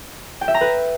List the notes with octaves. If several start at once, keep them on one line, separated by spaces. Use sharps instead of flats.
G5
E5
A#5
B4